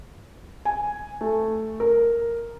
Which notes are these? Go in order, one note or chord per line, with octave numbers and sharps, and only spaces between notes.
G#5
A3
A#4